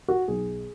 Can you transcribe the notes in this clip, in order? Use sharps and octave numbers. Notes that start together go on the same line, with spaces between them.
F#4
B1 G#4